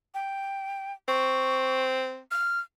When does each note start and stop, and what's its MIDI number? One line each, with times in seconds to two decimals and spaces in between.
0.14 0.93 79
1.08 2.20 60
1.08 1.84 85
2.31 2.60 89